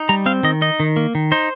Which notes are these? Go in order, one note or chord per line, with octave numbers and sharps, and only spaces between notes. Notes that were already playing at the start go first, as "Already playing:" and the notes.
Already playing: D#4
G3 A#5
C4 F5
D#3 D#5
D#4 D#5
D#3
A#3
D#3
D#4 C5